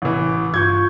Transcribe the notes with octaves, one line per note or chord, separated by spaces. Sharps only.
A1 E3
G2 F4 C#6 G6 G#6